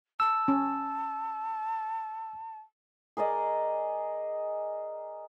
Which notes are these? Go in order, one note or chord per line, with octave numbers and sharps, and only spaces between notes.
A5 E6
C#4
G#4 A#4 D5 D#5